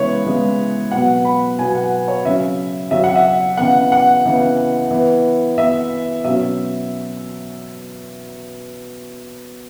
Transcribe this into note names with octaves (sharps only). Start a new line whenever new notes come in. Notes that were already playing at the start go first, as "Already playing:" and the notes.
Already playing: C#3 E3 G#3 B3 B4 C#5
C#3 E3 G#3 B3
B2 F#3 B3 F#5
B5
B2 F#3 B3 G#5
F#5
C#5
C#3 F#3 C#4 E5
C#3 F#3 C#4 E5
F#5
E5
C#3 E3 B3 F#5
F#5
C#3 E3 B3
E3 B3
E3 B3 E5
B2 F#3 C#4 E5